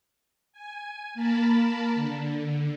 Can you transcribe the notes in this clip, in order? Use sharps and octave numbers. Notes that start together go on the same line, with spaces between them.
G#5
A#3 A#4 A5 B5
D3